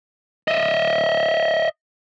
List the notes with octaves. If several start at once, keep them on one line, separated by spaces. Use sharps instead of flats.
D#5 E5